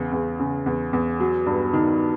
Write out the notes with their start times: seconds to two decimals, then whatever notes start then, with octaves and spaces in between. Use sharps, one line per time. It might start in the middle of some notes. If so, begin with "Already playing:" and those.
Already playing: E2 C#3
0.13 E2
0.40 C#3
0.66 E2
0.93 E2
1.20 F#3
1.46 G2
1.73 D#3